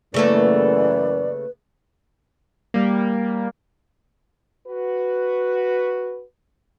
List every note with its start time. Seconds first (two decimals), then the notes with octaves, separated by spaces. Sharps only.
0.14 F#2 C#3 E3 A3 A#3 B4 D5
2.74 G3 A#3
4.67 F#4 B4